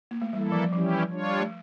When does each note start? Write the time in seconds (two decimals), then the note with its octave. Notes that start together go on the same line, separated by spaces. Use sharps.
0.11 A#3
0.22 A3
0.33 E3 G3 A#3 E4 A4
0.52 F3
0.72 E3 F3 G3 C#4 E4 G4
1.11 G3 D4 F4 C#5
1.40 A3